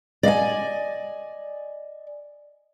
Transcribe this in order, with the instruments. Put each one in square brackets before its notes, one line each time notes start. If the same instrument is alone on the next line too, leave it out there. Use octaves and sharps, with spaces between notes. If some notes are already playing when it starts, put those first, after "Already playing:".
[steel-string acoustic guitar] D5 D#5 F5 G#5